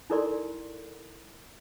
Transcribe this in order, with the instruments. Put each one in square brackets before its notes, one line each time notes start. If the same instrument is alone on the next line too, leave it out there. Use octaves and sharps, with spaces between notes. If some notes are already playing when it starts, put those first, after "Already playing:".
[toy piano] D#4 E4 A4 A#4 D5 C6